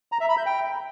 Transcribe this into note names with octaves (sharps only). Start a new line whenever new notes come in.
A#5
E5
B5
G6
G5